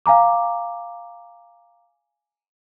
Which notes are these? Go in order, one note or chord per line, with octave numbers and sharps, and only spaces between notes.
F5 G#5 A#5 D6